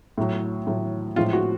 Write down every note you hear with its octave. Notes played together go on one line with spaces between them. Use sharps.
A2 F#3
A2 F#3
A2 F3 G#3 F4
F#4